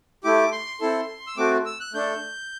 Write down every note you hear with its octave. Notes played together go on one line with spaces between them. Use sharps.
A3 E4 G4 D6
C6
C4 E4 A4
E6
A3 C4 F#4 D6
E6
F#6
A3 D4 A4 G6